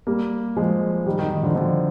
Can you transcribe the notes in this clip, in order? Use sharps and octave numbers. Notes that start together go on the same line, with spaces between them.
G3 A#3
F3 G#3
D#3 G3
D#3
D#3
D3 F3
D3 F3